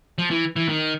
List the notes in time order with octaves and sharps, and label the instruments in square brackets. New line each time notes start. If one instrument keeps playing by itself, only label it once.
[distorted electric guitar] F3
E3
E3
D#3